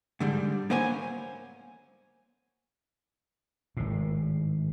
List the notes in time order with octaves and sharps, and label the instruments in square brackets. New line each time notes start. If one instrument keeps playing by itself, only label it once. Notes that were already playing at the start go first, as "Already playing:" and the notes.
[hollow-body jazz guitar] G#2 D3 G3
A#3 B3 C5 C#5 G#5
[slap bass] G#1 A2